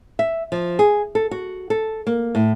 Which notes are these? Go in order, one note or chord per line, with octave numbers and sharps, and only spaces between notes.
E5
F3
G#4
A4
F#4
A4
A#3
A2